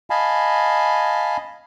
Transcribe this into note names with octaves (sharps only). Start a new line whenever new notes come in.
D#5 F5 G#5 A5 B5